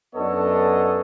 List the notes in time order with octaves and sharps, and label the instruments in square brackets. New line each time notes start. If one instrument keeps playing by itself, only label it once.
[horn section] F#2 B3 D4 A4 C#5 D#5